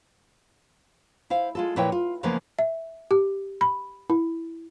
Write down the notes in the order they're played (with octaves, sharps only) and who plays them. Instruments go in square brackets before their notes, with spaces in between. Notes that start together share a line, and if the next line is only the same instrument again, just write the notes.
[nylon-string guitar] E4 C5 F5
G#3 F4 A4
A#2 F3 E4 B4 C#5 G5
F4
C#3 E3 F3 G#3 A#3 B3
[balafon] E5
G4
B5
E4